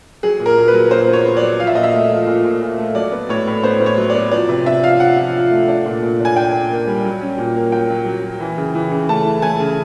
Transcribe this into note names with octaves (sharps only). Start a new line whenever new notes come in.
F#3 G#4
A#2
A#4
A#2
B4
F#3
A#2 C5
B3
C#5
B3
D5
F#3
F3 F5
E5
A#2 D#5
E5
A3
F3
A#2
A#2
A#2
A3
F#3 D5
B3
A2 C#5
A2
B3 C5
A2
C#5
F#3
B3 D5
F3 D5
C3
D4 E5
F3 F5
F3 F#5
F3
F3
A3
D4
A#2
A#2
D4
G#5
D4 G5
D4
A#3
G3
F#3
C#4
A#2
A#3
F#3 G5
F#3
F#3
F#3
E3
C#3
E3
C#3
A3 A5
E3
A3 G#5
C#3